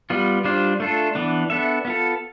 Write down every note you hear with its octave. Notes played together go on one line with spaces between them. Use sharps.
G3 B3 F4
G3 D4 F4 C5
A3 D4 F4 A4
E3 B3 D4
B3 D4 A4 E5
B3 F4 A4